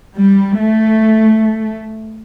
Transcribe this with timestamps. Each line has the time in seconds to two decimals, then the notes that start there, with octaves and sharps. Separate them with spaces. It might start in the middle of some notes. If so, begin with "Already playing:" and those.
0.16 G3
0.59 A3